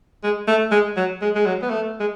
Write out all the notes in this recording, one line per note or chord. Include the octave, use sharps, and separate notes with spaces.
G#3
A3
G#3
F#3
G#3
G#3
F#3
B3
A3
G#3